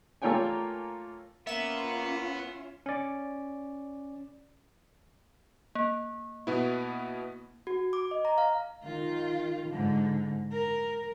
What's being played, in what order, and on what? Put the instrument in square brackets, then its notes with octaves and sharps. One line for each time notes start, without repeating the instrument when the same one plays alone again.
[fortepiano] A3 A#3 F4 C#5 G5 G#5
[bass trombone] A#3 [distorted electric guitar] B3 [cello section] C#4 F4 [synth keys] E5 E7
[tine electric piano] C#4 D5
[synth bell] A#3
[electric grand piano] B2 B3 E4
[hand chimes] F#4
D6
D#5
A#5
F5
[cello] D#3 F4
G#2 D3
A#4